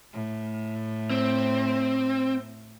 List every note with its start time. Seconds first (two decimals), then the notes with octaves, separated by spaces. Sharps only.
0.13 A2
1.11 C4